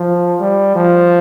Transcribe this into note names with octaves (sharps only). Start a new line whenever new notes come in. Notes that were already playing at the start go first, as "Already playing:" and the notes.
Already playing: F3
G3
F3